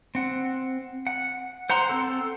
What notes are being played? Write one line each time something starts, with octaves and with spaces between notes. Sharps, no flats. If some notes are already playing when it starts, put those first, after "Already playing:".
C4 F#5
F#5
C5 F#5 A#5 C6
C4 A4